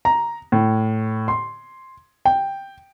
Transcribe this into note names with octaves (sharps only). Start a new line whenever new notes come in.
A#5
A2
C6
G5